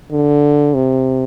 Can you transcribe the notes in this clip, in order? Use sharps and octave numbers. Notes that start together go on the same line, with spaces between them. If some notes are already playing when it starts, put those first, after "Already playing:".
D3
C3